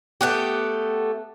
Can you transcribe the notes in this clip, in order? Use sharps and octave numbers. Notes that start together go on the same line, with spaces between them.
A3 B3 G4